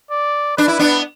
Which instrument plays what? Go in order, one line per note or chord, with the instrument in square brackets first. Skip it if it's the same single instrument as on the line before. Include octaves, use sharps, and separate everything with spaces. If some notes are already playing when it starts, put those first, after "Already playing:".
[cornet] D5
[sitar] D4 [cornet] B4
[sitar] E4
B3 D4